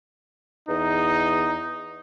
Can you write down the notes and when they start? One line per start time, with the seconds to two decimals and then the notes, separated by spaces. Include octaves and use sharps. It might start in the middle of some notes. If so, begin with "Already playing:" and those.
0.69 E2 D#4